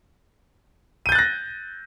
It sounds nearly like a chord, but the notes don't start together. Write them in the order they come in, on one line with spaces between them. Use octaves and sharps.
D#7 G6 A6 F#6 A#6